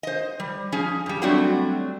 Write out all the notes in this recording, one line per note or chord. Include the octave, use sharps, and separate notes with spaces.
C5 D#5
G3
F3 C#4 G#4
G2 G3
F#3 G3 A3 C4 D4 F#4